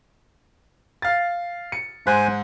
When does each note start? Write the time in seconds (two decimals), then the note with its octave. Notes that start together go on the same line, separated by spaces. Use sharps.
1.02 F5 A6
1.72 C#7
2.07 G#2 C5 G#5 F#6